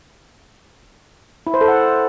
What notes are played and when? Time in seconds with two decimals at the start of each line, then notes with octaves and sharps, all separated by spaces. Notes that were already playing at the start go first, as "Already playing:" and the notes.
1.47 E4
1.54 C5
1.61 A4
1.68 F#5